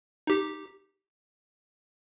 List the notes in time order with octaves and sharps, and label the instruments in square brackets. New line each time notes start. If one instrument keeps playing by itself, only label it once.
[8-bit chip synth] D#4 G4